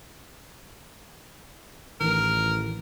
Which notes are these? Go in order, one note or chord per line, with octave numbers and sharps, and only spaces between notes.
A1 D#3 E3 A#4